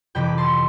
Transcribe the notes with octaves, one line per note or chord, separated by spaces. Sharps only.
F2 C3 E3 G5 B5
A5 C6